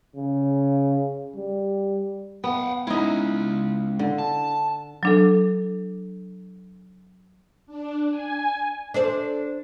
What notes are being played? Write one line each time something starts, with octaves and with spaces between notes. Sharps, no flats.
C#3
G3
B3 F#5 G5
G#3 C#4 D#4 E4
D3
A5
F#3 D4 A4
D4
G#5
D4 A4 C5